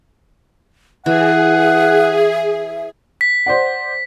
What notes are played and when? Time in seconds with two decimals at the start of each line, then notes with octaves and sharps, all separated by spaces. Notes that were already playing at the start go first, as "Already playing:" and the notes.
1.06 E3 G#4 E5 F#5
3.21 B6
3.46 C5 D5 F#5